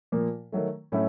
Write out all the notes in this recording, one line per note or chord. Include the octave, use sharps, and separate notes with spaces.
A#2 F3 A#3
D#3 F#3 A3
A2 F#3 A3 C#4 E4